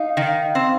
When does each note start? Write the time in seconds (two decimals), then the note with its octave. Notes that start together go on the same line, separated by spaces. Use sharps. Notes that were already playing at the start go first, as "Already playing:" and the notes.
Already playing: D#4 F5
0.17 D#3
0.55 C4